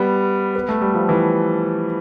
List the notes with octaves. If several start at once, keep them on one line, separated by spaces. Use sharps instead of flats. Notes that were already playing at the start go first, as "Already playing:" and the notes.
Already playing: G3 B3
B3
A3
G3
F3
E3